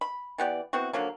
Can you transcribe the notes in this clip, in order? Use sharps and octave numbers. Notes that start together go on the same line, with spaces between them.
B5
E3 B3 G4 D5
B3 C4 E4 F#4
D3 F3 F#3 A#3